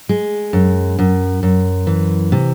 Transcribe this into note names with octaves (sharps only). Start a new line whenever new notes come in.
G#3
F#2
F#2
F#2
E3
C3